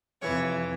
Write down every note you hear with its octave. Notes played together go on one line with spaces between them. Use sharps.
F2 C3 E3 C#5